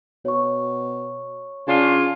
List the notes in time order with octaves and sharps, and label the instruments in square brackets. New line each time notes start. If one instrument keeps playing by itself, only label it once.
[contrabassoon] B2 [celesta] C#5 C#6
[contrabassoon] C#3 [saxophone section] C#4 D4 F4